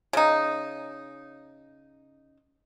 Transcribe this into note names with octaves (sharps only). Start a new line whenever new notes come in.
C#3 D#4